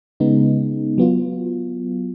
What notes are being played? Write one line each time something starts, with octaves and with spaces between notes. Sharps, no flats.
C#3 G#3 B3 D#4
F#3 B3 F4